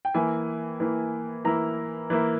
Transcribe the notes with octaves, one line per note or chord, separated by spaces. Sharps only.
G5
E3 A#3 E4 G#5
E3 A#3 E4
E3 A#3 E4 A#5
E3 A#3 E4